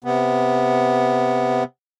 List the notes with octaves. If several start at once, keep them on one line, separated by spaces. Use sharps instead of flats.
C3 B3